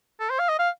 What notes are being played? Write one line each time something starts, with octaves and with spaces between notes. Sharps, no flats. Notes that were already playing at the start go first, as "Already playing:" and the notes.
A4
C5
F5
D#5
F5